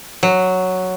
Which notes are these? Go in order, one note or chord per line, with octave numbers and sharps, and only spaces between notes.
F#3